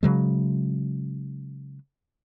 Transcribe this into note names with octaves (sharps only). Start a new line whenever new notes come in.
C#3 F#3 G#3